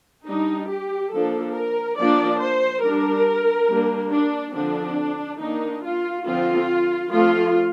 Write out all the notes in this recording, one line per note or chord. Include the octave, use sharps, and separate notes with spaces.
G3 D4 D#4
G4
F3 A#3 D4 A4
A#4
F3 A#3 D4 D5
C5
G3 D4 A#4
G3 A#3 D4
D4
D3 F3 C4 D4
D#3 A#3 D4 D#4
F4
D3 F3 C4 F4
F3 A3 C4 F4